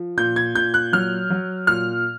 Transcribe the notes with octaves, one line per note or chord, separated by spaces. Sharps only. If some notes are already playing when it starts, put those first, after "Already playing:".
Already playing: F3
A#2 G6
G#6
A#2 G6
F#6
F#3 F6
F#3
A#2 F6